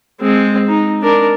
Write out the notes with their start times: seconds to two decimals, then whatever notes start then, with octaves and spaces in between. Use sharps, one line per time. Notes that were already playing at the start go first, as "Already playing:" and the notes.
0.21 G#3 C4
0.68 D#4
1.02 D4 A#4